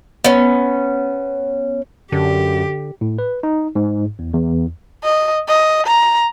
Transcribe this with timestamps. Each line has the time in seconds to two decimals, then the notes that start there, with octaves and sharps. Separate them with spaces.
0.24 B3 C#4
2.12 F#2 D3 G4
3.01 A2
3.19 B4
3.43 D#4
3.75 G#2
4.19 E2
4.34 E2
5.04 D#5
5.48 D#5
5.86 A#5